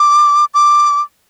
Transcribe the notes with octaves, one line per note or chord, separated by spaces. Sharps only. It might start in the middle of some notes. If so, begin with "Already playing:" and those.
Already playing: D6
D6